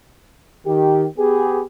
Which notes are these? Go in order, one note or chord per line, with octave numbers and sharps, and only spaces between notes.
D#3 G4
B3 G4 G#4